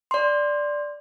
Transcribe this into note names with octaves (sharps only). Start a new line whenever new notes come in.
D5 C6